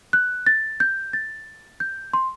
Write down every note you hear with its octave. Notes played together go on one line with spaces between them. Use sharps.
F#6
A6
G6
A6
G6
C6